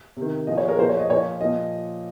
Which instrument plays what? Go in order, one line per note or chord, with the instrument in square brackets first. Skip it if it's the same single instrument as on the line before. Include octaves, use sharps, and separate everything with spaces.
[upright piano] C3 D#3
A#2 F3 D#5
C#5
G#4
A#4
A#2 F3 C5
C#5
D#5
A#2 C#5
F3
A#2 F3 D#5